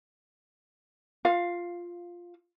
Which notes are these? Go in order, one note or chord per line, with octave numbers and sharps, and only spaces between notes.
F4 F5